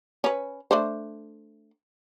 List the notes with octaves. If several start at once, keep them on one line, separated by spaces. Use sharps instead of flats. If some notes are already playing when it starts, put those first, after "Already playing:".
C#4 B4
A3 D4 C5